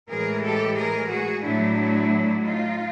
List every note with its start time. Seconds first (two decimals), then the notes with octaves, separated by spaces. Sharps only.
0.09 A2 E3 G#3 G#4 A#4
0.43 G4 A4
0.76 G#4 A#4
1.10 F#4 G#4
1.43 A2 F#3 A3 D4 E4
2.44 D#4 F4